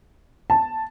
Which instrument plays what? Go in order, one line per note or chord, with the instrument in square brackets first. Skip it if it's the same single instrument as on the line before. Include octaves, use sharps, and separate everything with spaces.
[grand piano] A5